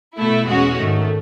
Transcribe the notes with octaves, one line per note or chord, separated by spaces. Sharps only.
B2 A3 E4
E2 B2 G#3 C#4 F#4
G#2 D#3 A3